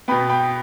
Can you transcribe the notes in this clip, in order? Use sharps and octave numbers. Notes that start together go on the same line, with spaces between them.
B2 B3 G5 B5
G5 B5